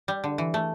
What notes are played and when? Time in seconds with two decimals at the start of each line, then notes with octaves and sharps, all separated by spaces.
0.08 G3
0.24 D3
0.38 E3
0.54 A3